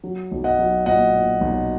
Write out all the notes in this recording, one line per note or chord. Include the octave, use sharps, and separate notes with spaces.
F#3
B1
D#5 F#5
F#3
A#2 D#5 F#5
A#2
B1